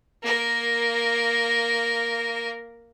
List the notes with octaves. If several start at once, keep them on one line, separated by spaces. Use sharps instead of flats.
A#3 A#4